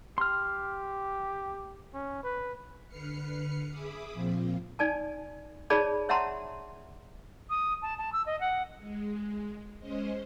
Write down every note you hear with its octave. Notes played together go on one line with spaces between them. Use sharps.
G4 C6 F6
C#4
B4
D3 B4 F6 C7 C#7
G#4 E5 B5 D6 D#6
A#2 F3 C4 F4
D#4 D5 G#5 A5
D#4 G#4 C#5 D5 A5 B5
C#5 E5 F#5 A5 A#5 C6
D#6
A5
A5
E6
D#5
F#5
G#3
G#3 C#4 C5 D#5